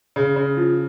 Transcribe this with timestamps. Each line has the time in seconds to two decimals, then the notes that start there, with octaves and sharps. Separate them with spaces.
0.16 C#3
0.36 C#3
0.57 F3